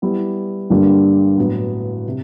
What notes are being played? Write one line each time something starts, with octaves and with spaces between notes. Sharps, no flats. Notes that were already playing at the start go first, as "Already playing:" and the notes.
G3 B3 E4
G2 D3 G3 A#3 D4
A2 F#3 B3
C3